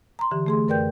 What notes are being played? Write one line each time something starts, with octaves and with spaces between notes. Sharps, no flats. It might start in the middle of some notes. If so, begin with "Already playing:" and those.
A#5 C6
D3 E3 G4
A3 G#4 C6
F#2 A#4 B4 D5 G5 G6